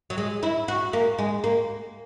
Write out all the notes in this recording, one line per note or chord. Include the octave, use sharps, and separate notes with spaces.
F#3
G#3
E4
F#4
A#3
G#3
A#3